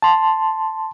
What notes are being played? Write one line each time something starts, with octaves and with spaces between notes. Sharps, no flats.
A5 C6